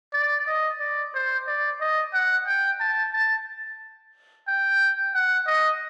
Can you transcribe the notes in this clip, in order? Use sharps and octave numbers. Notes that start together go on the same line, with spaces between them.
D5
D#5
D5
C5
D5
D#5
F#5
G5
A5
A5
G5
F#5
D#5